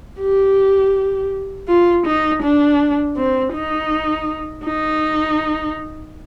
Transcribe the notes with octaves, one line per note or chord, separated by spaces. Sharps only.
G4
F4
D#4
D4
C4
D#4
D#4